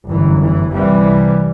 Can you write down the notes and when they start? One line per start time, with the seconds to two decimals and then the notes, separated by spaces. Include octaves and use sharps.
0.09 G1 F#2 E3
0.41 E3
0.73 C2 C3 E3 G3